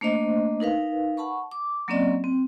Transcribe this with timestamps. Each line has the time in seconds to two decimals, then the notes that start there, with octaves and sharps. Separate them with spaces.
0.01 A3 A#3 D4 C5 D#5
0.60 D#4 A#4 B4 F5
1.17 F#5 A5 B5 C#6
1.51 D6
1.88 F#3 A#3 C4 C#4 D5 D#5
2.24 C4